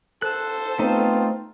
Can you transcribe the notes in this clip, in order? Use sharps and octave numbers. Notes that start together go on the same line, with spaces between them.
A4 C5 F#6
A3 B3 C4 D#4 F4